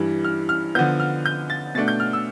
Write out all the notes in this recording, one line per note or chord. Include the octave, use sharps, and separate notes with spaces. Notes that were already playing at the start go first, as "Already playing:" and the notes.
Already playing: G2 E3 G3
F6
F6
D3 F3 B3 G6
F6
G6
A6
B2 A3 D4 A6
G6
F6
E6